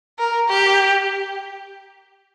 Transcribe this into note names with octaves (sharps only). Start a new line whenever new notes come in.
A#4
G4